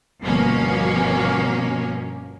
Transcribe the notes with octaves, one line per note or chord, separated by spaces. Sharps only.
G1 B2 F3 A#3 C#4